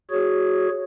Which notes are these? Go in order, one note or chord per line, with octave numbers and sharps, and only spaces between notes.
F#4 G#4 C#5